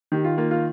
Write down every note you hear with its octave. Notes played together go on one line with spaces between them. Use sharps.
D#3 G4
F4
A#3 F4
F4